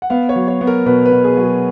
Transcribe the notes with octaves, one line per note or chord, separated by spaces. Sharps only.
F#5
B3 F5
C#5
F#3
C#5
B3
A#4
B2 B4
B4
B2
G#4
F#3
G#4